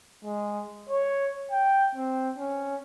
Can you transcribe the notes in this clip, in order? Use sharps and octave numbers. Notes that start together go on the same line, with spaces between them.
G#3
C#5
G5
C4
C#4